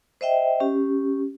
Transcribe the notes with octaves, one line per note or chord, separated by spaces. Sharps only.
C5 D#5 E5 G5
C#4 G4